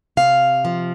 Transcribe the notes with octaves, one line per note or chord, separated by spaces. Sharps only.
C3 F5
F3